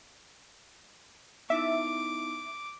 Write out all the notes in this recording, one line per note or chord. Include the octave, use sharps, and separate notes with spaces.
B3 D#4 E4 E5 D6